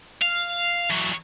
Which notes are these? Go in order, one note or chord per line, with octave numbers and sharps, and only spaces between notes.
F5
E3 F#3